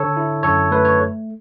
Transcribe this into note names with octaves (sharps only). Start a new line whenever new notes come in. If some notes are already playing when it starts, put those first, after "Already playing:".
Already playing: D3 A4 C#5
E4
F#2 A4 C#5
A3 B4
C#5